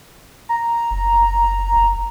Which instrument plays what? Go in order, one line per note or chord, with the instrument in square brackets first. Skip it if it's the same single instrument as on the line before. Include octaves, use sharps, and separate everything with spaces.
[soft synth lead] A#5
[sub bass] F#1
F#1